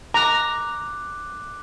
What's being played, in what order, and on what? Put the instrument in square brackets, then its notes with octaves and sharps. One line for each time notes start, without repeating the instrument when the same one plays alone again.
[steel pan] A#5 [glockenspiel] D6 F#6